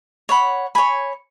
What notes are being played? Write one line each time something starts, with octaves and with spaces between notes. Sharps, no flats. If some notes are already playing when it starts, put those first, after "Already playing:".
C#5 F#5 B5
C#5 G#5 B5